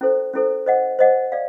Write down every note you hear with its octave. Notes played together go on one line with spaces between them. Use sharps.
C#4 E4 A4 C5
C#4 E4 A4 C5
C5 D#5 F#5
C5 D#5 F#5
D5 F5